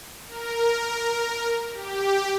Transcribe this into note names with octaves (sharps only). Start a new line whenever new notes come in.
A#4
G4